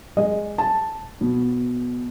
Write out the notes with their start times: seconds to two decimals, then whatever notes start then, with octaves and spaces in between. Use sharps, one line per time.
0.17 G#3 G#4 D#5
0.58 A5
1.21 B2